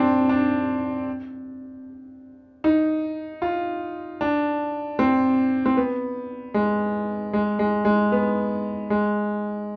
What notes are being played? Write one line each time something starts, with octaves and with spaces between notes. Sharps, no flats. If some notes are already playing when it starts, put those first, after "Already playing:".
Already playing: C4 D4
D4
D#4
F4
D4
C4
C4
B3
G#3
G#3
G#3
G#3
B3
G#3